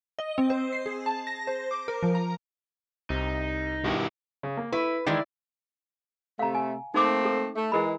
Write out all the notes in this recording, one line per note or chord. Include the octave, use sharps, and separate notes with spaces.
D#5
C4
C5
C7
G#4
A5
A#6
C5
D6
A#4
F3
A#5
C2 C3 D#4
G2 B2 D#3 E4 G4
C#3
A#3
E4 B4
D#3 E3 G#3 E4 D5
C3 A3 F5 A#5
G#5
A3 A#3 C4 D#4 D6
A4
A3
E3 G#3 E4 A#4 B5